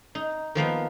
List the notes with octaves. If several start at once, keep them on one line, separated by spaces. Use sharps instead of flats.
D#4
D#3 F3 A#3 B3